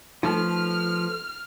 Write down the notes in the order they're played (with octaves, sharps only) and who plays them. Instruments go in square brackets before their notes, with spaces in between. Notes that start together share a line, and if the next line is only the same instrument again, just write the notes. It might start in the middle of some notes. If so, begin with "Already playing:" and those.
[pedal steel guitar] F3 [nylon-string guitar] A3 A4 B4 [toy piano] D#4 [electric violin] F6